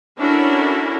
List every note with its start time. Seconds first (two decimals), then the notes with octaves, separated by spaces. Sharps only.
0.18 C#4 D4 E4 F#4 A4 A#4